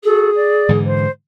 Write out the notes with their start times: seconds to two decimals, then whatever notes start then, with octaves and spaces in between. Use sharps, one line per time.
0.03 F#4 G#4 A4
0.35 D5
0.69 G#2 D3 E3
0.85 C5